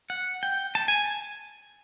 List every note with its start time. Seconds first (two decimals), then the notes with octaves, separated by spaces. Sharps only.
0.10 F#5
0.43 G5
0.75 A5
0.88 G#5